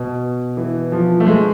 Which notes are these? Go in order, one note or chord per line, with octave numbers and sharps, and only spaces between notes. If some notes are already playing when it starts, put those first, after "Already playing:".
Already playing: B2
E3
F3
A3
G#3